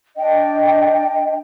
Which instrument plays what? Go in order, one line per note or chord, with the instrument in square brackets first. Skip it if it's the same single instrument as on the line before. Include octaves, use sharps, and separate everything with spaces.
[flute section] D4 D#5 G5